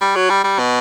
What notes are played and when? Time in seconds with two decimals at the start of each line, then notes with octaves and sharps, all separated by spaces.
0.01 G3
0.16 F#3
0.30 G3
0.44 G3
0.59 B2